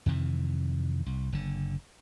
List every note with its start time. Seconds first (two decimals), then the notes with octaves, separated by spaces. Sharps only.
0.06 F2 C3 D#3 E3
1.06 C2
1.33 F#1 D3